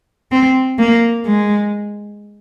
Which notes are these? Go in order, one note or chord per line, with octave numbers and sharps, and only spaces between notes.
C4
A#3
G#3